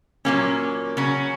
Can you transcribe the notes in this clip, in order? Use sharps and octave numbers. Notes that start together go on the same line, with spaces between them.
A#2 F#3 A#3 C#4
C#3 F#3 C#4